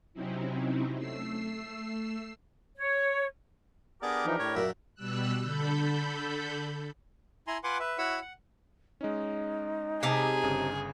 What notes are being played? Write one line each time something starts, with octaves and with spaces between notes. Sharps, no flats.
C3 F#3 C4 C#4 D#4 E4
A3 E6 C7
C#5
B3 D4 G4 G#4 A#4 D5
E3 F3 D#4
A2 C#5
F#2 A#2 E5
B2 G3 E6 F#6
D3 A4 B5 G6
E4 G#5 A#5 C6
F4 B4 F#5 G#5 C6 D6
B4 E5
E4 F#4 C#5 F#5 B5 E6
F#5
G#3 C#4 D#4
C3 G#4 A#4 A5
G1 C#3 D#6